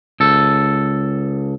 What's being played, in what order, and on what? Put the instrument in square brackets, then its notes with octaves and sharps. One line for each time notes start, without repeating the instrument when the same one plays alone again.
[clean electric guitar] C#2 A4